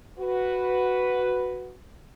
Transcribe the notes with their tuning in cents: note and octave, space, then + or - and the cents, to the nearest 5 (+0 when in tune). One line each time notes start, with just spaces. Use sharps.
F#4 +0 B4 +0